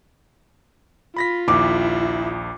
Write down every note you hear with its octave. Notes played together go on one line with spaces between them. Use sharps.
F4 B5 A#6 B6
A#1 D#2 E4 D6